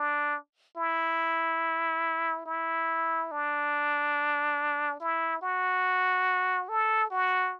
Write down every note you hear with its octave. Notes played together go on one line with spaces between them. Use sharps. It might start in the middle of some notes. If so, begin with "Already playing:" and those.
Already playing: D4
E4
E4
D4
E4
F#4
A4
F#4